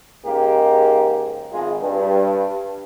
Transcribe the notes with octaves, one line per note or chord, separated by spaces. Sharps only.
G#2 C#3 A#3 D#4 G4
G#1 G#3 F4 G#4
G2